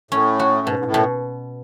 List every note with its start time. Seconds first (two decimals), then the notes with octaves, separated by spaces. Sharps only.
0.11 A2 C#4
0.39 F#4
0.67 G#2 B2
0.79 G#2
0.85 A2
0.94 B2